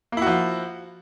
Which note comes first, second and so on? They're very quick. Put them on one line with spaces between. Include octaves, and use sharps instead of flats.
A#3 E4 F#4 F3